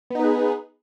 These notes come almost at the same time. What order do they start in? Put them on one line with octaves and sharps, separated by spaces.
B3 D#4 B4 G#4